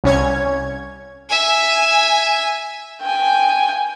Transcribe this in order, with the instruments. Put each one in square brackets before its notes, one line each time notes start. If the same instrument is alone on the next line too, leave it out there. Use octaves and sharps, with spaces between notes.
[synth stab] C2 C#4 C#5 G#6
[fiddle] E5 G#5
[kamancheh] G5 G#5